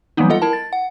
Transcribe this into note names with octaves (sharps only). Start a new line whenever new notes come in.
E3 F#3 G3 A#3 B3 D#4
G3 F4 A4 D#5 F#5
E4 A#4 A5
A6
F#5